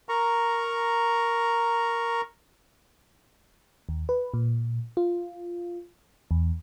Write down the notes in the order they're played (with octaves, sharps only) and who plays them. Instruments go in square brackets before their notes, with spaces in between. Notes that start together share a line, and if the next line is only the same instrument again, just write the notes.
[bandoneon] A#4 A#5 C#6
[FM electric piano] D#2
B4
A#2
F4
E2